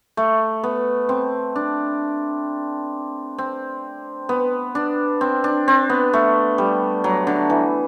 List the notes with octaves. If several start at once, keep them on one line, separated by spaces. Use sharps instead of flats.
A3
B3
C4
D4
C4
B3
D4
C4
D4
C4
B3
A3
G3
F#3
D3
E3